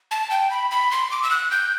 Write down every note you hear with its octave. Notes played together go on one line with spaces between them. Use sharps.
A5
G5
B5
B5
C6
D6
E6
F#6
G6